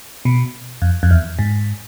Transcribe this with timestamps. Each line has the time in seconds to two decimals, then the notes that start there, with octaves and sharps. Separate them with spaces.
0.25 B2
0.82 F2
1.03 F2
1.11 E2
1.39 G#2